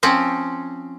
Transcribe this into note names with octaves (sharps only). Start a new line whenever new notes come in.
F3 C4 C#4